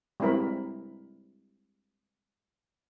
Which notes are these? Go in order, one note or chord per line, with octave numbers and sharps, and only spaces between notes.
G3 G#3 C4 E4 A#4 B5